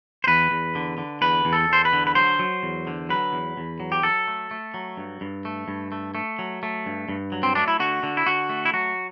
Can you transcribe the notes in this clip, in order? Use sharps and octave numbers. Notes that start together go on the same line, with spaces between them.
C5
E2 B4
E2
D3
D3
E2 B4
E2
A4
E2 C5
B4
D3
B4
F#3 C5
F#3
E2
D3
F#3 B4
E2
E2
F#3
G4
F#3 A4
A3
A3
F#3
G2
G2
A3
G2
A3
A3
F#3
A3
G2
G2
F#3
C4
A3 D4
E4
D3 F#4
D3
E4
D3 F#4
A3
E4
F#3 F#4